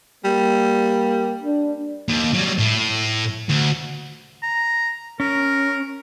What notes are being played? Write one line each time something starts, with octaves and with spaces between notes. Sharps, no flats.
G3 A#3
D4
D#2
F#3 G3
A2
D2
A#5
C#4 A#4